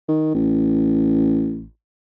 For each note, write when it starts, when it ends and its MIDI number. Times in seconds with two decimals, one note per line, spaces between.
0.09 0.31 51
0.35 1.66 33